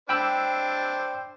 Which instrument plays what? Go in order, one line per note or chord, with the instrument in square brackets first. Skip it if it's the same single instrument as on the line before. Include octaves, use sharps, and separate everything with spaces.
[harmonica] D4 C5 [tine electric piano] G5 B5 E6